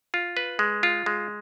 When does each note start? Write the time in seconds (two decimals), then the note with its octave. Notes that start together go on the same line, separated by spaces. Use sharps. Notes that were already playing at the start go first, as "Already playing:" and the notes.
0.14 F4
0.37 B4
0.59 G#3
0.83 F4
1.06 G#3